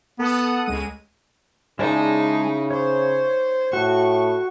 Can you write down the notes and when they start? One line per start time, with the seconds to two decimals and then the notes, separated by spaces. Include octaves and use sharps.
0.19 B3 A4 F#5 D#6
0.66 C#2 G#3 D#7
1.79 C#3 G#3 D#4 E4 D5 A5
2.71 C5 C#5
3.73 A2 F#4 C#6